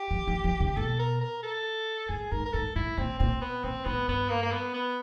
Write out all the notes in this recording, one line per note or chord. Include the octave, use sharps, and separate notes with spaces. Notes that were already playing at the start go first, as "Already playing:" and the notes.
Already playing: G4
F3
F3
F3
C#3
B2 A4
A#4
A#4
A4
A2 G#4
G#2 A#4
A#4
G#2 A4
A2 E4
A#2 C4
A#2 C4
B3
A#2 C4
A2 B3
G2 B3
A#3
A#3
B3
B3